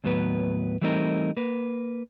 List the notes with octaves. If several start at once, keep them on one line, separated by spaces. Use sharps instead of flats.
D#2 A2 F#3 B3 B4
E3 G3 A3 C4 D#4 A#4
A#3 B4